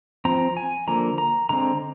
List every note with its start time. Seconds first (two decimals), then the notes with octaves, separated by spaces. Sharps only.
0.25 F3 C4 A#5
0.57 G#5
0.87 D3 F3 A#3 A#5
1.18 A#5
1.49 D3 G#3 C4 A#5